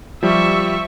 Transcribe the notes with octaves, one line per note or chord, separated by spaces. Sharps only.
F3 G3 E5 C#6